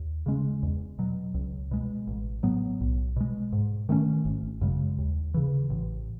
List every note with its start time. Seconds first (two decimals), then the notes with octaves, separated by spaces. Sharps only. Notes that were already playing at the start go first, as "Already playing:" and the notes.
Already playing: D#2
0.26 C#3 G#3 C#4
0.63 E2
0.99 B2 F#3
1.34 C#2
1.71 B2 G#3
2.07 A1
2.43 A2 F#3 B3
2.81 B1
3.16 B2 G#3
3.53 G#2
3.89 D#3 A3 C#4
4.25 G#1
4.61 F#2 C#3 G#3
4.98 D#2
5.34 C#3 E3
5.70 A1